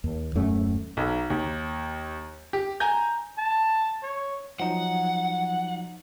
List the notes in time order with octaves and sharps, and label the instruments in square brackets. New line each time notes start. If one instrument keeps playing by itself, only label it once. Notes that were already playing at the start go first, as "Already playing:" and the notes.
[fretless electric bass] D#2
D#1 F#2 A3 C#4
[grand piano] B1
D#2
G4
G#5 A#5 G6
[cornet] A5
C#5
[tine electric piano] F3 F#3 D#4 [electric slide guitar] F#5